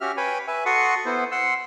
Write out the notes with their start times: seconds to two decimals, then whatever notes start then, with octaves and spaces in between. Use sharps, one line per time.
0.01 C#4 F#4 G4 E5 F6
0.17 B4 C#5 G5 G#5 B5
0.47 B4 E5 G#5
0.66 F#4 A4 F#5 C6 C#6 D#6
1.06 B3 E4 C5
1.32 F#5 C6 E6